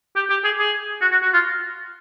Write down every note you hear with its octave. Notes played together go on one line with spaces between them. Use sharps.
G4
G4
G#4
G#4
F#4
F#4
F#4
F4